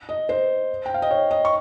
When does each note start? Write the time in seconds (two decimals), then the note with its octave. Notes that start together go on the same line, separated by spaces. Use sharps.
0.09 D#5
0.29 C5
0.86 G5
0.94 F5
1.02 D#5
1.11 C#5
1.31 D#5
1.45 C#6